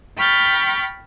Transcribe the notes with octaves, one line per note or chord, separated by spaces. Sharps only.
G5 B5 C#6 F6 G6 A6